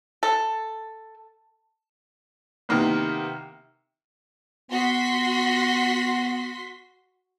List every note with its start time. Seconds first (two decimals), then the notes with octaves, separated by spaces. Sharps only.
0.23 A4
2.69 C3 D#3 A#3 B3
4.71 B3 F#4 C6 B6